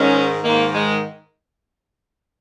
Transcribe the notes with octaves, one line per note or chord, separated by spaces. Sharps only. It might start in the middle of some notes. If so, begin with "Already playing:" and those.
Already playing: G#2 D#3 C#4
G#2 D#3 A#3
G#3